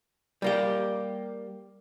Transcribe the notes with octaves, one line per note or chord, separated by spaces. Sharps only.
G3 A#3 G4